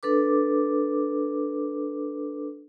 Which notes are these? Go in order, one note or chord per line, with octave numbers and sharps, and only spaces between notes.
D4 A4 B4 D6